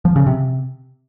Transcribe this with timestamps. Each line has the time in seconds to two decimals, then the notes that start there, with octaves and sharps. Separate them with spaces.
0.05 F3
0.16 C#3
0.27 C3